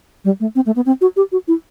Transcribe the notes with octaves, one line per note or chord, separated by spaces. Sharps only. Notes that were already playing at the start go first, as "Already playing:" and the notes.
G3
A3
C4
A3
B3
C4
F#4
G4
F#4
E4